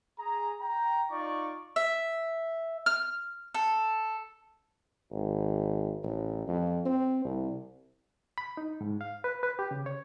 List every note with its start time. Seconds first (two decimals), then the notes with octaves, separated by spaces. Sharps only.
0.19 G#4 A#5
0.61 G5 A#5
1.11 D#4 F4 D5 C#6
1.76 E5
2.86 F6
3.54 A4
5.11 G#1
6.03 A1
6.47 F2
6.86 C4
7.25 C2
8.38 B5
8.57 D#4
8.81 G#2
9.01 F5
9.24 B4
9.43 B4
9.59 G4
9.71 C#3
9.86 C#5